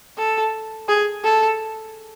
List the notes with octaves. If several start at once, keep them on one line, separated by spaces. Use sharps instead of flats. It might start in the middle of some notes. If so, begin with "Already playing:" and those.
A4
G#4
A4